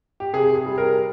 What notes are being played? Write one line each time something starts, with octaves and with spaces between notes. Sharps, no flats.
G4
C3 G#4
G#4
G3
A#4